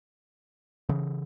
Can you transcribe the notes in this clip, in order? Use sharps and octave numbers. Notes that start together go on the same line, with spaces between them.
C#3 E3